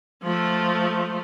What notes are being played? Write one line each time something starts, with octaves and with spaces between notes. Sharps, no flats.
F3 A3